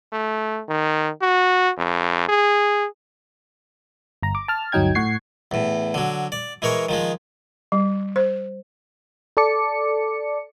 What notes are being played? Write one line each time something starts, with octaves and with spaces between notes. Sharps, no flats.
A3
D#3
F#4
F2
G#4
G1 A#5
D6
A5 F6
G1 D2 F#3 D#4 G5 G#6
A2 F#5 C#6 G#6 C7
E2 A2
D3 F#3
D5
E3 G#3 A#4 C#5
D#3 F3 G#3
G3
C5
A4 D5 A5 D6 C#7